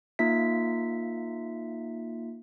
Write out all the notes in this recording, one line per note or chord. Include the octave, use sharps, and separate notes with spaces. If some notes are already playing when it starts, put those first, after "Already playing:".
A#3 D#4 F4 E5 B6